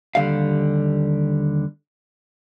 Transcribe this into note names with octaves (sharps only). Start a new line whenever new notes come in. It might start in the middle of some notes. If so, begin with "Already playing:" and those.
D#2 D3 G3 F5